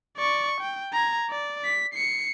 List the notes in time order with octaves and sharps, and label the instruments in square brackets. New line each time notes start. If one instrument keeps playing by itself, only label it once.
[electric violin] D5 C#6
G5
A#5 G#6
D5
B6
C7 C#7